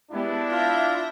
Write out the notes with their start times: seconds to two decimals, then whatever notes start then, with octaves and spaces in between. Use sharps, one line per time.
0.11 G#3 B3 D4 E4 G4
0.51 F4 E5 G6 A#6